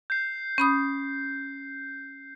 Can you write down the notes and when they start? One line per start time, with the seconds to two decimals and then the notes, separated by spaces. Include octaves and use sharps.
0.10 G6 C7
0.58 C#4 B5 D#6